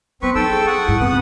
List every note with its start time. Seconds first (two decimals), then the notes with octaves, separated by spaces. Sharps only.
0.22 F#3 B3 C4 B4 C#6
0.35 F#3 D#4 A4 G5 E6
0.50 G#4
0.67 F#5 C#6 D#6
0.88 G2 E4
1.00 F#2 C#3 B3 C4 F#5 D#6